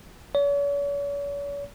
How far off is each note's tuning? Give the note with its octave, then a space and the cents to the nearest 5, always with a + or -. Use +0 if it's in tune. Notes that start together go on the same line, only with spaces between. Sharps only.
C#5 +45